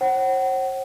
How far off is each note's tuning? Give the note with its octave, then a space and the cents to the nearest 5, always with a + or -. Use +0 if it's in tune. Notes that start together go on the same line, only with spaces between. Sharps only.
C5 +45 F#5 +35